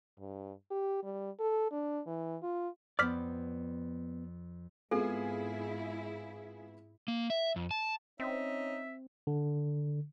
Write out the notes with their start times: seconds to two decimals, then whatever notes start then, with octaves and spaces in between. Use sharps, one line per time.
0.19 G2
0.71 G4
1.03 G3
1.40 A4
1.71 D4
2.06 E3
2.42 F4
2.99 F2 B3 C5 D5 D6 F6 B6
4.91 G#2 G#3 B3 C4 E4 F4 G#4 A4
7.08 A#3
7.30 E5
7.56 F2
7.71 A5
8.20 C4 C#4 D#4 E5
9.27 D3